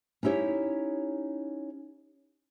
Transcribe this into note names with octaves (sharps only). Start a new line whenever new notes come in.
C#4 D#4 E4 G4 C#5